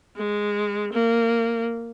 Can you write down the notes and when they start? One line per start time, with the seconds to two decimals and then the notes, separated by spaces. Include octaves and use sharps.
0.16 G#3
0.93 A#3